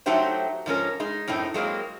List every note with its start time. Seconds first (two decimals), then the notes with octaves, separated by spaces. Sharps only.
0.06 F#3 A3 D#4 G4 C5 E5
0.66 G#2 F3 C#4 A#4
1.00 G#3 D#4
1.28 F#2 A2 C4 D#4
1.54 F#3 G#3 A#3 C4